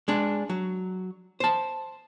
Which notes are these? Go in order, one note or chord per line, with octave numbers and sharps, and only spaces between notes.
G#3 D4
F#3
C5 A5